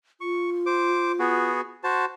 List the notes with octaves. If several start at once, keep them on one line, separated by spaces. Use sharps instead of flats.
F4 C#6
C5 D6
B3 F#4 G#4
F#4 C5 A5